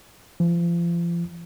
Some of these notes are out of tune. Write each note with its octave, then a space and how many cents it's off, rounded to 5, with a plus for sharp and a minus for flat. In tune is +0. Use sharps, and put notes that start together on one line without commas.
F3 -35